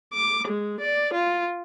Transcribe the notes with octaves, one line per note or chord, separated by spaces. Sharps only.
D6
G#3
D5
F4